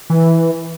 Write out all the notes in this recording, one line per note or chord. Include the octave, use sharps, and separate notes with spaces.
E3